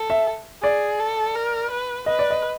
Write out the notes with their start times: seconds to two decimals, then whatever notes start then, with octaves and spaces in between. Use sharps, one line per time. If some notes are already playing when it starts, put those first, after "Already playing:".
Already playing: A4
0.10 E5
0.63 G#4 D5
1.00 A4
1.35 A#4
1.71 B4
2.06 B4 D#5
2.19 D5
2.30 D#5